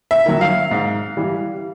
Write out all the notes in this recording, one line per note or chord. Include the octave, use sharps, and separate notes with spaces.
E5
D#3 F#3
F5
G#2
E3 G3